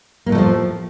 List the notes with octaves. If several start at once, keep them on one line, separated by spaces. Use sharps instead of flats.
A2 F3 F#3 A3 A#3